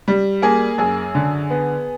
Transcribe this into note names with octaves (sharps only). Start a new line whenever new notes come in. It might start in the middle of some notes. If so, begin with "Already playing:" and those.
G3
A#3 G#4
F#2 G#4
D3
B3